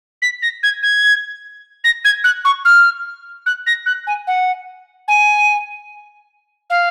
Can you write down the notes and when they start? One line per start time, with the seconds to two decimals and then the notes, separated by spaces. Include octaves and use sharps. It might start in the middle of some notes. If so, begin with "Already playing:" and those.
0.22 B6
0.42 A#6
0.63 G#6
0.83 G#6
1.84 A#6
2.04 G#6
2.24 F#6
2.45 C#6
2.65 F6
3.46 F#6
3.66 A#6
3.86 F#6
4.07 G#5
4.27 F#5
5.08 G#5
6.70 F5